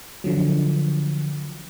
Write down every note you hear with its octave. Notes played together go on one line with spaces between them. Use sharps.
D3 F3 F#3